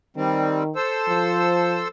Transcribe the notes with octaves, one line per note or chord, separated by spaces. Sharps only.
D#3 G3 C4
A4 C5 E6
F3